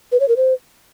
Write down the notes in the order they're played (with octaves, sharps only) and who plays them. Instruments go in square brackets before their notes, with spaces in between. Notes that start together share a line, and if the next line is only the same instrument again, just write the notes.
[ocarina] B4
C#5
A#4
C5